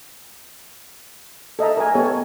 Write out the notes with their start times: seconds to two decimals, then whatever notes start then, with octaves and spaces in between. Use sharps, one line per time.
1.59 A4 D#5 E5 A#5
1.77 A#4 G#5
1.95 B3 G4 A4 C#5